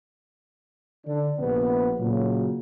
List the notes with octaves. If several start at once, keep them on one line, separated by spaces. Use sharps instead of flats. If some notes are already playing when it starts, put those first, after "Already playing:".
D3 D4
A#1 C3 B3
A#2 C#3 F#3